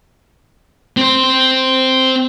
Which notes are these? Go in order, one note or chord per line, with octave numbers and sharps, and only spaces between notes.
C4 C5